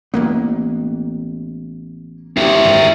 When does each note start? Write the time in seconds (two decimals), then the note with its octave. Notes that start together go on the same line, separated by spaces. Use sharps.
0.14 A1 A#3 B3
2.37 D#2 E4 G4
2.65 G#1 F#2